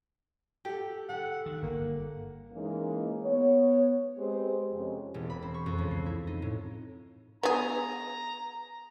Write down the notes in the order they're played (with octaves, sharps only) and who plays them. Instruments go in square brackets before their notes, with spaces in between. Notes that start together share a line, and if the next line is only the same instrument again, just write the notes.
[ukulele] G4 [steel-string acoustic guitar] A4 F#5
[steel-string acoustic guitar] D3 A4 [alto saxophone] F#5
[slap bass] D#3
[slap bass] G1 [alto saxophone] A#3
[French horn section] E3 G#3 A#3 C#4 D#4
B3 C#5
G#3 C4 G4 B4 C5
F2 C3 F3 G#3 C#4
[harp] E1
B5
C4
C#6
F2
C#2
C7
E4
D#4
A2
[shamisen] B3 G#4 [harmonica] A#5